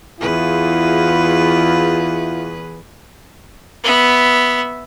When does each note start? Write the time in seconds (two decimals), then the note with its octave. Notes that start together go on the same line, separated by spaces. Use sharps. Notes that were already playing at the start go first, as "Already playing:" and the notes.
0.21 E2 E4 F4 G#4 B4
3.83 B3 E5